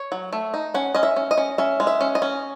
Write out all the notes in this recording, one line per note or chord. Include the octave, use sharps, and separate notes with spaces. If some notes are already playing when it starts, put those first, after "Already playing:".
Already playing: C#5
F#3
A3
D#4
C#4 F#5
C#4 D#5
E5
C#4
D#5
C#4
C#4 E5
G#3
E5
C#4
D#5
C#4